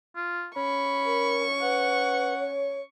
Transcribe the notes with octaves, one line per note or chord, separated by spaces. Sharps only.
F4
C#4 B5 C#6
A#4
B4 F#5
C#5